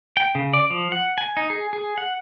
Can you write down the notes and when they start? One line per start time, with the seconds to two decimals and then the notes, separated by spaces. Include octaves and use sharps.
0.17 G5
0.35 C#3
0.53 D5
0.70 F3
0.92 F#5
1.18 G#5
1.37 D#4
1.50 G#4
1.73 G#4
1.98 F#5